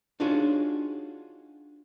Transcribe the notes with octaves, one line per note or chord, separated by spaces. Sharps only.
D4 D#4 F4 F#4 G#4 C#5